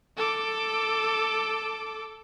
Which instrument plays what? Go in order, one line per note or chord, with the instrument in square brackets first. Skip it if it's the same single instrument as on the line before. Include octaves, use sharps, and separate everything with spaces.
[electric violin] A4 D6